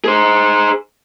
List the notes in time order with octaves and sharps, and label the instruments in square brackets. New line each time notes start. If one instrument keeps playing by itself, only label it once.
[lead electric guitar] G#4 C5